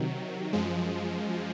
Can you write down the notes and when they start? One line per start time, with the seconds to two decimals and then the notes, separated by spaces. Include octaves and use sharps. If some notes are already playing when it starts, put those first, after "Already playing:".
Already playing: C3 D#3 F#3
0.53 F#2 F3 G#3